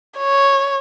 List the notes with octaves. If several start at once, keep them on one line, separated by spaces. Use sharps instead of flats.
C#5